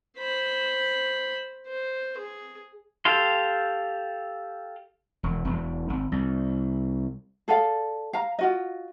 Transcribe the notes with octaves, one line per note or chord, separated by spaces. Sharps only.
C5 B5
C5
G#4
G4 A4 F5 C6
E1
E1
G#1
C2
G#4 A4 D5 F5
F5 A#5
F4 F#4 D#5